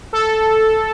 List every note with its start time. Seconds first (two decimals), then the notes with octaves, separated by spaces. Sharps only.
0.13 A4